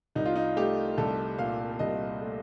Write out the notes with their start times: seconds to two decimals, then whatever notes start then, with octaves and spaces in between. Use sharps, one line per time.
0.16 C2 D#4
0.26 F4
0.36 D#4
0.56 A3 G4
0.98 C2 A4
1.39 A#2 F5
1.79 C2 D#5
2.21 A3